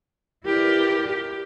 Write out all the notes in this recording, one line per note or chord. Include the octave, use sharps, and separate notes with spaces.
E4 G4 A#4 B4 D5
G4